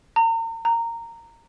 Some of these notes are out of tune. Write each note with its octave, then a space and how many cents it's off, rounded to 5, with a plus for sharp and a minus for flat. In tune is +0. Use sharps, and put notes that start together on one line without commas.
A#5 -40
A#5 -15